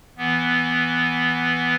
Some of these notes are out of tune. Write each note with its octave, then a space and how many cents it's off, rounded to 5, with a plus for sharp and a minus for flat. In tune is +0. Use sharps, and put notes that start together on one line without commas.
E3 +0 B3 +0